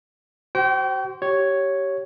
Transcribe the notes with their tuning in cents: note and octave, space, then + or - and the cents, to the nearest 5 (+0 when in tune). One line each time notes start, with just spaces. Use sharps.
F#4 +35 C5 +0 G5 -30
G4 -20 C#5 +0